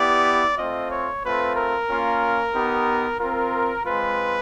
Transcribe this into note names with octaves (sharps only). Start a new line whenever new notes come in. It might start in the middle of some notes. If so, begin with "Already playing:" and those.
Already playing: B3 E4 G4 D5
A3 C4 F4 D#5
C#5
A3 C4 F4 B4
A#4
A#3 C#4 F4
B3 D#4 G4
C4 F4 A#4
G#3 C4 F4 B4